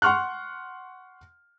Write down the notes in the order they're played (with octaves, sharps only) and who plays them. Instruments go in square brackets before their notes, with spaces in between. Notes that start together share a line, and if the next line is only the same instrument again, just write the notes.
[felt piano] F#5 C6 C#6 F6 F#6